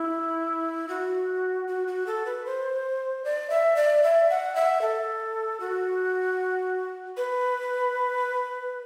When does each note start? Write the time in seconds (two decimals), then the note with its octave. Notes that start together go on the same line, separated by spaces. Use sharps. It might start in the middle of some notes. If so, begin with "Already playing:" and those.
Already playing: E4
0.88 F#4
1.67 F#4
1.87 F#4
2.06 A4
2.26 B4
2.46 C5
3.24 D5
3.50 E5
3.76 D5
4.03 E5
4.30 F#5
4.55 E5
4.81 A4
5.60 F#4
7.17 B4